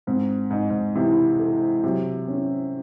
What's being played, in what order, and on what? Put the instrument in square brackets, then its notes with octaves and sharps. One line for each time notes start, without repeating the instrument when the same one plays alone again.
[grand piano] G#2 [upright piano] C4
[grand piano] G#2 [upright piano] D#4
[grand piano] G#2
[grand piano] C3 [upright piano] E3
[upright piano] A4
[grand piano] C3 [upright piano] F#3
[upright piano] C#4